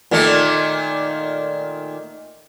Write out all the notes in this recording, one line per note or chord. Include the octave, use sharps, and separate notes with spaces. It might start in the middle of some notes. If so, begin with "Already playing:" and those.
A#2 D#3 A3